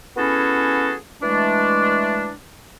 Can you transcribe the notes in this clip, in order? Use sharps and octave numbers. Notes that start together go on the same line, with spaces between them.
B3 C#4 E4 F#4 G#4 A4
E3 G#3 A3 D4